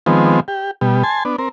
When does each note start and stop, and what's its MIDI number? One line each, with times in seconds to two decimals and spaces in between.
0.06 0.40 51
0.06 0.40 53
0.06 0.40 56
0.06 0.40 59
0.06 0.40 60
0.48 0.71 67
0.81 1.03 47
0.81 1.03 55
1.03 1.23 80
1.03 1.23 81
1.03 1.23 84
1.25 1.36 59
1.25 1.36 62
1.39 1.49 60
1.39 1.49 70